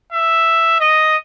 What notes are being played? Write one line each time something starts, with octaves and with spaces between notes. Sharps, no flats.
E5
D#5